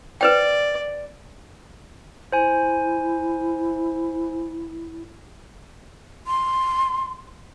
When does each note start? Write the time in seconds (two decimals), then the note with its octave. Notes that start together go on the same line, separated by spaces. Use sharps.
0.21 B4 C5 D5 G5
2.32 E4 C5 G#5
6.27 C6